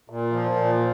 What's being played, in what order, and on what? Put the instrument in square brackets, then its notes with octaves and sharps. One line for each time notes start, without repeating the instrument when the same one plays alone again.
[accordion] A#2
F3
A#2